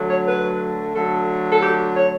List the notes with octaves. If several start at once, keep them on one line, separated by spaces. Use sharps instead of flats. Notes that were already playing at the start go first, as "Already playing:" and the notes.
Already playing: D3 F#3 A3
C#5
B4
D3 F#3 A3 A4
A4
G4
C#5